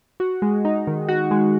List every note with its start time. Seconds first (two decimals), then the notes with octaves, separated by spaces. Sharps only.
0.20 F#4
0.42 G#3
0.65 D#4
0.87 D#3
1.09 F#4
1.31 G#3